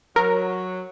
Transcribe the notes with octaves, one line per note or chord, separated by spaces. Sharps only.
F#3 A#4